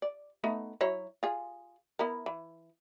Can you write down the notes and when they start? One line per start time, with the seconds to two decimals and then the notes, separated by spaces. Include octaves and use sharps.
0.02 D5
0.44 A3 B3 D#4
0.81 F#3 E4 C#5
1.23 F4 G#4
1.99 B3 E4 A#4
2.26 E3